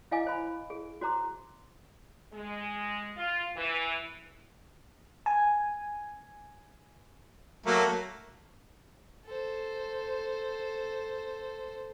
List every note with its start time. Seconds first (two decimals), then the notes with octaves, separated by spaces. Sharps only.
0.11 E4 D#5 F5 G#5 D6
0.27 C5 B5
0.70 G#4
1.01 F#4 C5 A#5 D6
2.33 G#3
3.17 F4
3.56 E3
5.26 G#5
7.66 F#3 A3 A#3
9.26 A4 C5